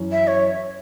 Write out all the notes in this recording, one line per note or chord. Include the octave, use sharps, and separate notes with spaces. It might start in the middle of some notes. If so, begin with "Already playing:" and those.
Already playing: F#2 E3 C#4
E5
C#5